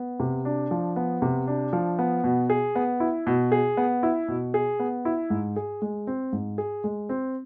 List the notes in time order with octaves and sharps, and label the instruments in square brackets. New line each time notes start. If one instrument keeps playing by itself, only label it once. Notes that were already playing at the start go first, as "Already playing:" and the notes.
Already playing: [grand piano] B3
C3
D4
F3
B3
C3
D4
F3
B3
B2
G#4
B3
E4
B2
G#4
B3
E4
B2
G#4
B3
E4
G#2
G#4
G#3
C4
G#2
G#4
G#3
C4